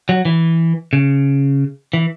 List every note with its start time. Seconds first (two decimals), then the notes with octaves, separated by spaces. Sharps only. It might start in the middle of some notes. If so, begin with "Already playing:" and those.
0.09 F#3
0.25 E3
0.93 C#3
1.94 E3